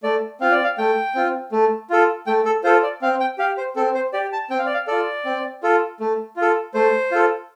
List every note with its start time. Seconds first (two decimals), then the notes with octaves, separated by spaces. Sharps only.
0.03 A3 D5
0.41 C4 F4 F5
0.52 D5
0.64 F5
0.78 A3 G5
1.15 C4 F4
1.52 A3
1.90 F4 A4
2.27 A3 G5
2.45 A4
2.64 F4 A4 C5
2.83 D5
3.02 C4 F5
3.20 G5
3.38 G4 F5
3.58 C5
3.76 C4 A4
3.95 C5
4.13 G4 D5
4.32 A5
4.50 C4 G5
4.59 F5
4.66 D5
4.74 F5
4.87 F4 A4 D5
5.25 C4
5.63 F4 A4
6.00 A3
6.36 F4
6.42 A4
6.74 A3 C5
7.12 F4 A4